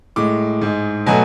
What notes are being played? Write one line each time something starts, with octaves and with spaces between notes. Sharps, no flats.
A2 G#3 D6
G#2 G#3
B2 F#3 A3 G#5